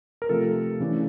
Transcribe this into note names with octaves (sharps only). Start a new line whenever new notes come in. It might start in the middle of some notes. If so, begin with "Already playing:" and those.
A#4
C3 F3 A3 A4
C#3 E3 A3 D4